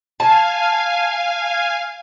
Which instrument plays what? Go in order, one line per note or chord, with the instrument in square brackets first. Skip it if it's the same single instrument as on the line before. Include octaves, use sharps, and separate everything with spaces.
[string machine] F5 G#5 [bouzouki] A5